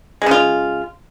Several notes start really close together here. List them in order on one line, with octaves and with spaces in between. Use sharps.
G#3 C#3 F4